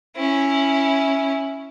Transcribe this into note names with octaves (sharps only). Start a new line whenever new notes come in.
C#4 E4